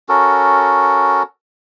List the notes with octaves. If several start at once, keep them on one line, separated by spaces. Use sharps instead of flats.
C#4 F#4 A4 A#4